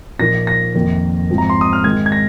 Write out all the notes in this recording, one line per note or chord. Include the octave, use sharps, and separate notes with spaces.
A#2 F3 A#3 D#4 A#6
A#6
F2 D#3 A#3
G#2 F3 C4
A#5
C6
D#6
F6
G#2 D#3 G#3 G#6
G#6
A#6